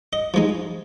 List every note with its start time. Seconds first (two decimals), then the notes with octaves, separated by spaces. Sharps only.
0.13 D#5
0.34 F3 G#3 D#4